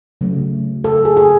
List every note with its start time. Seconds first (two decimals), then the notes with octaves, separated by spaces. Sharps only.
0.21 C#3 F#3 A3
0.84 A4
1.05 G#4
1.17 G#4